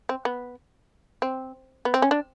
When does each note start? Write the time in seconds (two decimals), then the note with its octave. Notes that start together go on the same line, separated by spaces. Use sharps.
0.09 C4
0.25 B3
1.22 C4
1.85 B3
1.94 C4
2.02 C#4
2.11 D4